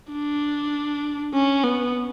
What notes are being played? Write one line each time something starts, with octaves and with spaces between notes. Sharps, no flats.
D4
C#4
B3